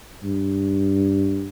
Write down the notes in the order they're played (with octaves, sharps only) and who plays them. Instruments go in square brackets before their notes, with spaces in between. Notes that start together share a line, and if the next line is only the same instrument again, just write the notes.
[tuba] G2